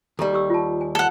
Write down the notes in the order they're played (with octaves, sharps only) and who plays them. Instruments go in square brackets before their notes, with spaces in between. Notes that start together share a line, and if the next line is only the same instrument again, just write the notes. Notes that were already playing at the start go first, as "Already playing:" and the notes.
[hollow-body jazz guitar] D#2 G3 [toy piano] G4 A4
[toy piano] G4 C#6 E6
F4 A5
G#5
[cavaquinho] A4 F#5